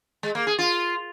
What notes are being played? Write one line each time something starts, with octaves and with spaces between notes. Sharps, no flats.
G#3
A#3
G#4
F4